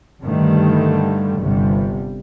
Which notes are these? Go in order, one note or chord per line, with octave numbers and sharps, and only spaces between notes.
G2 D3 D#3 G3 A3
G1 C3 G3